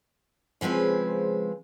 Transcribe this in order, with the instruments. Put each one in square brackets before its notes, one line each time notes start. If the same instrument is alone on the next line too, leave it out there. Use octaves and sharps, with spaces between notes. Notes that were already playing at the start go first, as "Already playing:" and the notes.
[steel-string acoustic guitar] C#3 F3 G#3 C4 B4